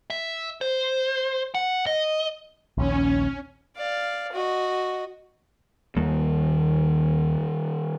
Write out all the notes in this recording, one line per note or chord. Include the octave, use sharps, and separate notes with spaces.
E5
C5
F#5
D#5
A#1 D#2 C#4
D5 F5
F#4 D#5
D#2 D#3 G3 A#3